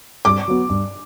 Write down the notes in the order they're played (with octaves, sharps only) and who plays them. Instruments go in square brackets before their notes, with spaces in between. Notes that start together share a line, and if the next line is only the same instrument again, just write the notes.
[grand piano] G2 [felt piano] D6
[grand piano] F#3 B3 F#4
G2